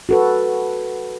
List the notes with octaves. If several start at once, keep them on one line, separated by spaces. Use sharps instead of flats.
F#4 A4 B4